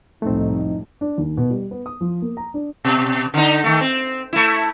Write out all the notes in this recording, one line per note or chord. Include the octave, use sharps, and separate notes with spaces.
C2 F2 A2 A3 C4 D#4
D4
D#2
B2
G3
B3
D#6
F3
A#3
A#5
D4
B2
D3 D#4
D#3 A3
C4
A3 E4